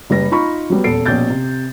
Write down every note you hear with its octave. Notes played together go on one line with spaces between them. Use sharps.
F#1 G3 B4 A#6
D#4 F4 A#5 B5 C#6
F#3 G3 B3
D#1 E2 A4 C7 D7
A#1 B2 C#4 G6 A6
C3